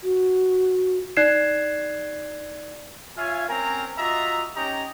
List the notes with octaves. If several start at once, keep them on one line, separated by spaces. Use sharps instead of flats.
F#4
D#4 D5 F#6 G#6 C7 E7
F4 C#5 E5 F5 G#5
C4 C#4 A#4 G#5 A#5
F4 F#4 D#5 E5 A#5
C#4 D#4 G4 D#5 G5 A#5